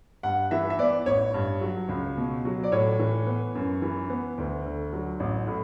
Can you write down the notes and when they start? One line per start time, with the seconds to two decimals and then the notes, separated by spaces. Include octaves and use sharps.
0.23 G2 F#5
0.51 E3 E5
0.70 E5
0.79 B3 D5
1.06 A1 C#5
1.34 G2
1.61 F#3
1.89 C#2
2.17 B2
2.45 F#3
2.63 D5
2.72 A2 C#5
2.99 E3
3.27 B3
3.55 F#2
3.82 E3
4.10 B3
4.38 D2
4.66 D3
4.93 F#3
5.20 A1
5.47 A2